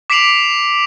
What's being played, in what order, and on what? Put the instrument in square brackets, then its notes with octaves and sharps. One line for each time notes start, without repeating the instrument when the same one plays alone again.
[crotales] D6 B6 C7 D7 F7 F#7